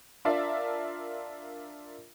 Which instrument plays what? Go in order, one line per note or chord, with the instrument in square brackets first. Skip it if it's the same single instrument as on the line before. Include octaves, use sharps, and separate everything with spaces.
[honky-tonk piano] D4 F4 A#4 D5 E5 F5